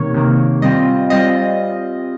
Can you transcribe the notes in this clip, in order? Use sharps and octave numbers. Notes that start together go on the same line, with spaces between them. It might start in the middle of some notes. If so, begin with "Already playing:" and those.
Already playing: C3 D#3 A#3 C#5
C3 D#3 A#3
G3 C4 F4 D#5
G3 C4 F4 D#5